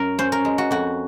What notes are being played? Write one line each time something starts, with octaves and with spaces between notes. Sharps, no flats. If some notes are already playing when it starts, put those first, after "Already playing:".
Already playing: F#2 A#4
C#4 C5
A#4
G#3
F#4
F2 F#4